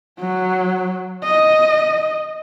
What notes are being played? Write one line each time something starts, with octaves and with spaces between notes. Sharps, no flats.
F#3
D#5